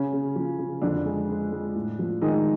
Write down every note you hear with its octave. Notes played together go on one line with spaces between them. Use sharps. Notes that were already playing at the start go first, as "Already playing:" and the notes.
Already playing: C#3 C#4
C#3
F3
C#3
F2 D3 D4
G#3
G#3
G#3
A2
F3
D#3 G#3 D#4